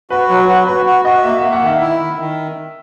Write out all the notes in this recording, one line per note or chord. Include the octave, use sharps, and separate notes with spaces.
F#4 B4
F#3
B4
F#4
F#4 B4
F#4
F#4 D#5
A#3 E5
A#3 E5
F#5
D#3 E5
E4
D#3
D#3